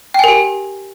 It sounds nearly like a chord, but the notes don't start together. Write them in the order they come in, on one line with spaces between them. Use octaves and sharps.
G5 G#5 A#4 G4